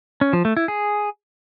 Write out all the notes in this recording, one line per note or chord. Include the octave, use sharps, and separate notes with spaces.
C#4
F3
A3
E4
G#4